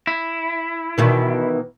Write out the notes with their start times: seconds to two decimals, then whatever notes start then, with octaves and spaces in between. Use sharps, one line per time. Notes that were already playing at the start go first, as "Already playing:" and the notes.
0.07 E4
0.98 B2 D#3 E3